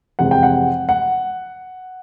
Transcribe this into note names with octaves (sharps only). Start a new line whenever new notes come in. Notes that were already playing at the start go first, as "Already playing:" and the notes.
F2 C3 E3 G#3 F#5
G5
F#5
F#5